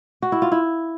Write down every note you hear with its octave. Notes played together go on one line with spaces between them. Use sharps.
F#4
E4
F4
E4